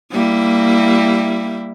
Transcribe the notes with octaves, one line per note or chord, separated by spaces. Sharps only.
G3 A#3 E4